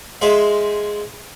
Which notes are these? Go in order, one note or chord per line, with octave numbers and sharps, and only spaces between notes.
G#3 G#4 C5 E5 F5